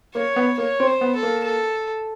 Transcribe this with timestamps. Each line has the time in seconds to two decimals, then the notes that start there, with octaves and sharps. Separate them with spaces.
0.14 A#3 C#5
0.36 B3
0.58 A#3 C#5
0.80 C4
0.87 C5
1.01 B3
1.15 A4
1.23 A#3
1.44 A4